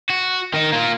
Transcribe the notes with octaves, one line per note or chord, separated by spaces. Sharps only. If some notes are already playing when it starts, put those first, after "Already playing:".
F#4
D#3 D#4
A#3 F4